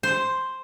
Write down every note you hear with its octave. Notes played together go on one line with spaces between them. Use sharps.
C5